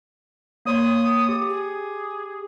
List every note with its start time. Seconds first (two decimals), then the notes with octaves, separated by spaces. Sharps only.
0.65 A#3 C#5 C6 D#6
1.29 G4
1.49 G#4